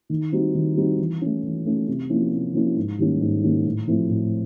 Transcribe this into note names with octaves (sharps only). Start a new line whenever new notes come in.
D#3
G3 C4 D#4 F#4
D#3
G3 C4 D#4 F#4
E3
A3 C#4
E3
A3 C#4
C3
F3 A#3 C#4 E4
C3
F3 A#3 C#4 E4
G#2
D#3 G3 A#3 C#4
G#2
D#3 G3 A#3 C#4
A2
F3 A3 C4 E4
A2